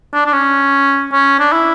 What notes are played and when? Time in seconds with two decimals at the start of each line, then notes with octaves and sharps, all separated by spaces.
0.14 D4
0.26 D4
0.33 C#4
1.12 C#4
1.40 D4
1.52 E4